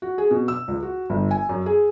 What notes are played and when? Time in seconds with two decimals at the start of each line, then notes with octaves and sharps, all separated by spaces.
0.02 F#4
0.18 G#4
0.31 B2
0.48 E6
0.68 C#2
0.83 F#4
1.10 G1
1.31 G#5
1.49 F#2
1.66 G#4